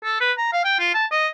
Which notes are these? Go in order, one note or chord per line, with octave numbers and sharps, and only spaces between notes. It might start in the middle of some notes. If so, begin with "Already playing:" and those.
A4
B4
A#5
F5
G5
F4
A5
D#5